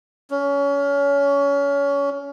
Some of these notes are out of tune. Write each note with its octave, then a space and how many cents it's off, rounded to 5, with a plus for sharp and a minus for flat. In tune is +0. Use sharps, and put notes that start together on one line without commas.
C#4 +25